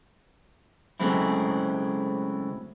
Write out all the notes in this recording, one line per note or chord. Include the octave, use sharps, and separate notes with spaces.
C#3 F#3 G#3 A3 C4 E4